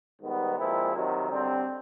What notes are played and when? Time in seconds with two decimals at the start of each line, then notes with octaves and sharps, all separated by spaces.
0.21 G#2 D#3 G3 B3
0.56 A#2 F3 G#3 C4 E4
0.92 C3 D#3 F#3
1.30 D3 G3 C4